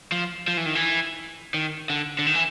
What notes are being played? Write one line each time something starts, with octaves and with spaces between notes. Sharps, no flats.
F3
F3
E3
D#3
E3
D#3
D3
D3
D#3
E3